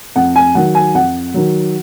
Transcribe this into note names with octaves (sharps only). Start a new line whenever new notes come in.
F2 F#5
G#5
D#3 F#3 F#5
G#5
F2 F#5
D#3 F#3